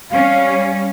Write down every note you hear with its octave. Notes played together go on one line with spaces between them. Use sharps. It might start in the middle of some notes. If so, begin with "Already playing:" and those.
G3 C#4 F5